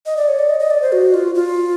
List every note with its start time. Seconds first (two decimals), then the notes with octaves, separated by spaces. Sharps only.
0.06 D#5
0.17 D5
0.28 C#5
0.39 D5
0.49 D#5
0.59 D#5
0.70 D5
0.82 C5
0.92 F#4
1.14 F4
1.35 F4